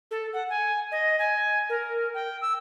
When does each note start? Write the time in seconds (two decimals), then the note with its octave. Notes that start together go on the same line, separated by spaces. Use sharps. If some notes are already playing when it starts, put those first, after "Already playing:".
0.11 A4
0.33 F#5
0.50 G#5
0.92 D#5
1.19 G#5
1.70 A#4
2.14 G5
2.42 E6